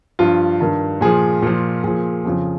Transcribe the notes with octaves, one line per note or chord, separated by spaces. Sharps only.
G2 F3 F4
G2 D#3
A#2 F3 G#4
A#2 F3
A#2 F3 G#4
F2 C#3 F3